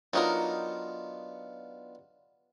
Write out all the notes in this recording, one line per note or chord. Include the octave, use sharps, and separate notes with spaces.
F#3 B3 D4 D#4 F4 A#4